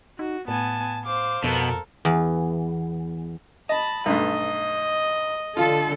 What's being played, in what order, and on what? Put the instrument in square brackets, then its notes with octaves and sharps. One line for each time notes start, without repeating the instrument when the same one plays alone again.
[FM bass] D#4 [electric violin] F#4
[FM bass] A2 [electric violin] B3 G#5 [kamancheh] A5
[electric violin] C5 F5 [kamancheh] D6
[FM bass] F2 [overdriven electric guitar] B2 [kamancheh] A4 A#4
[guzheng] E2
[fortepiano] D#5 [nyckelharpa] A5 B5
[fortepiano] B1 G2 A3 [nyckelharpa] D#5
[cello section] D3 A4 [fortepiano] F4